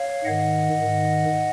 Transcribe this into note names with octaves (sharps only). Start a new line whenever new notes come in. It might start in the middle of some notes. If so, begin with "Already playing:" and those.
Already playing: C#5 F5
G#2 D#3 D#5 F#5
G#2 D#3